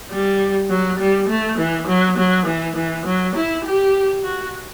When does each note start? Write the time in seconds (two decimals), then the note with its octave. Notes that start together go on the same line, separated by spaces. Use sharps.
0.11 G3
0.70 F#3
0.99 G3
1.28 A3
1.58 E3
1.88 F#3
2.17 F#3
2.46 E3
2.76 E3
3.06 F#3
3.35 E4
3.65 G4
4.24 F#4